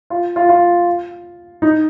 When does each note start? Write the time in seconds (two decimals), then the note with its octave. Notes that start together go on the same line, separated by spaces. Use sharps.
0.10 F4
0.36 F4
0.49 F4
1.62 D#4